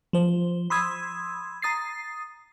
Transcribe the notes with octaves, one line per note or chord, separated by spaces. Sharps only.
F3 C5
B5 C6 D#6 E6 G#6
A#5 D#6 A6 C7